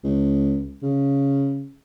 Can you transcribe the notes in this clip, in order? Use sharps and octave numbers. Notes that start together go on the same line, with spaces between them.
C#2
C#3